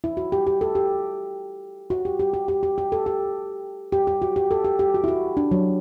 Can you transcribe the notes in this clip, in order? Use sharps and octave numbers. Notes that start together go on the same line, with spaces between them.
E4
F#4
G4
G4
A4
G4
F#4
G4
G4
G4
G4
G4
G4
A4
G4
G4
G4
F#4
G4
A4
G4
G4
F#4
E4
F#4
D4
F#3